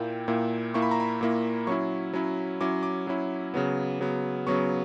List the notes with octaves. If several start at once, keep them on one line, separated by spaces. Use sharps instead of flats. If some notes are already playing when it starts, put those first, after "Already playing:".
Already playing: A#2 A#3 E4 G5
A#2 A#3 E4
A#2 A#3 E4 C#6
B5
A#5
B5
A#2 A#3 E4
F#3 C#4 E4 C#6
F#3 C#4 E4
F#3 C#4 E4 D6
D6
F#3 C#4 E4
C#3 F#3 B3
C#3 F#3 B3
C#3 F#3 B3 C#6